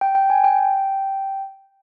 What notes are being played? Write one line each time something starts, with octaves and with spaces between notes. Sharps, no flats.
G5
G5
G#5
G5
G5